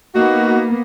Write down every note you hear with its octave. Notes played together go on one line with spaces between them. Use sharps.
A#3 B3 D#4 F#4